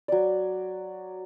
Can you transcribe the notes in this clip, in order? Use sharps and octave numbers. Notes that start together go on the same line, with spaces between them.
F#3 D5